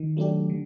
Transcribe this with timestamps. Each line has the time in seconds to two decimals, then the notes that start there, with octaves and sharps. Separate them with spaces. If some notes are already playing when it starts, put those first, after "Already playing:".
Already playing: D#3
0.17 F#3 A3 D4 G4
0.50 D3